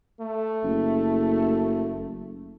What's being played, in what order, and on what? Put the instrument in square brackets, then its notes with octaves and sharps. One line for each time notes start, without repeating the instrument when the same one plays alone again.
[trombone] A3
[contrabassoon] F#1